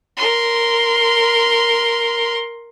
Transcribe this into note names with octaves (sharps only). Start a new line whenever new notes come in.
A#4 C6